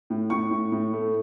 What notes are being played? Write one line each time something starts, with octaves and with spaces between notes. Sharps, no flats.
A2
A2 C#6
A2
A2
A3